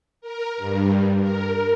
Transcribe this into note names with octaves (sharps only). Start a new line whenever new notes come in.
A#4
G2
A#4